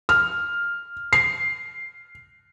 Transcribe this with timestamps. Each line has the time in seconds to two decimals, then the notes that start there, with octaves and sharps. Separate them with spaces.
0.09 F6
1.13 C7